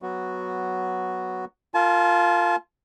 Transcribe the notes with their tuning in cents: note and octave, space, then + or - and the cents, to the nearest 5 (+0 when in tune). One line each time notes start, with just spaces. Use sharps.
F#3 +0 B3 +0 F#4 +0
F4 +0 A#4 -30 A5 -40